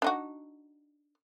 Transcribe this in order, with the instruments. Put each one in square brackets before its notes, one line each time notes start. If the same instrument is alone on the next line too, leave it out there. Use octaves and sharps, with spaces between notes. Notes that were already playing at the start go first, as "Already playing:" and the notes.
[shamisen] D4 D#4 F#4